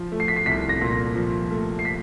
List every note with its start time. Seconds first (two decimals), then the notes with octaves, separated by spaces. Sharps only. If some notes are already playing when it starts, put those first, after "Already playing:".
Already playing: F3
0.12 A3
0.20 C7
0.28 B6
0.36 C7
0.46 C2 B6
0.69 A#6
0.81 A#2
1.16 F3
1.50 A3
1.79 C7
1.85 B6